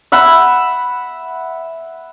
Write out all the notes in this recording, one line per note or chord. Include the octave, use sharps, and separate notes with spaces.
E5 F#5 B5